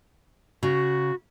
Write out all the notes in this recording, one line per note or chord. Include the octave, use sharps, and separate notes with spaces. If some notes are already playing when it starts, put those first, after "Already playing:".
C#3 F#4